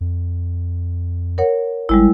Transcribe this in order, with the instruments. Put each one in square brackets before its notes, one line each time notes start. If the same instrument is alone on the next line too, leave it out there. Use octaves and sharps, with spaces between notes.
[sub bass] F2
[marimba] A#4 C#5 F#5
[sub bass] G#1 [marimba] G3 G#3 E4